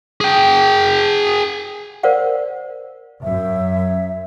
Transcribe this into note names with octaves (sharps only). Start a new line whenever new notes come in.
G#4 G5
A#4 C5 D5 F5 F#5
F#2 E5